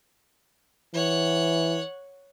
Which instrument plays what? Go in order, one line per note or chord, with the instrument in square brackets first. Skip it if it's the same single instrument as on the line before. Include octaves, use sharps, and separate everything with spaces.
[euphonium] E3 [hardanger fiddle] C#5 F#5